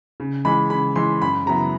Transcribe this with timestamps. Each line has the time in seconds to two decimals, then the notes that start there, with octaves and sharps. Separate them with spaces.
0.20 C#3
0.45 E3 G#3 B5
0.70 C#3 B5
0.96 E3 G#3 C6
1.22 F#2 B5
1.46 C#3 F#3 B3 E4 A#5